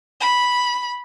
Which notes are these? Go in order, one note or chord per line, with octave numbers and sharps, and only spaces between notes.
B5